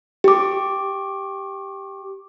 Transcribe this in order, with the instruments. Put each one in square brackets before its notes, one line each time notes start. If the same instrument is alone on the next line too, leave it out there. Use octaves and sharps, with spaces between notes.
[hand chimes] G4 D6